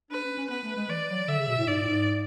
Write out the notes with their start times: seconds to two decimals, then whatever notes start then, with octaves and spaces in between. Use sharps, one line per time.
0.11 D4 B4
0.24 C#4
0.37 C#4
0.49 B3 B4
0.63 A3
0.76 G#3
0.89 E3 D5
1.09 F#3
1.28 D3 E5
1.39 C#3
1.48 B2
1.58 A2
1.67 G#2 D5
1.83 A2
1.87 G#2